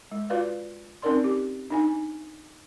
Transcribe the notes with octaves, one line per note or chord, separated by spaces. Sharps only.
G#3
F4 F#4 B4 D5 F5
C4 C#4 D#4 A#4 D5 C6
G4
D4 D#4 G#5